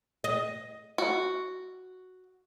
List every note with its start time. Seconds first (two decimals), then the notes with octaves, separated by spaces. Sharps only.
0.24 D#5
0.98 F#4